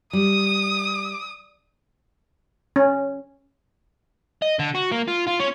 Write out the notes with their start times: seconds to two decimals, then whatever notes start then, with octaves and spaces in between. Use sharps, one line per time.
0.13 G3 D#6
2.76 C#4
4.42 D#5
4.59 D3
4.75 F#4
4.92 A#3
5.08 F4
5.27 F4
5.39 C#4